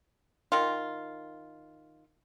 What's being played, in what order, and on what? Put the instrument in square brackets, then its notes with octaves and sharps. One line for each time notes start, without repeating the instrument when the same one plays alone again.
[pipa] D#3 F4